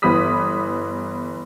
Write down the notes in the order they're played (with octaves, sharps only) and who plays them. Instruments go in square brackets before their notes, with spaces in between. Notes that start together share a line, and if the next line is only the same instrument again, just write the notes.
[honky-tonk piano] G1 E3 B3 B5 D#6 B6